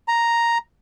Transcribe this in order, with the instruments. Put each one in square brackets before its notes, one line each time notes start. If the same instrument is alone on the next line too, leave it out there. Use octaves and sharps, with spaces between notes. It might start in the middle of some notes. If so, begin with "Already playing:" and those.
[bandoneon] A#5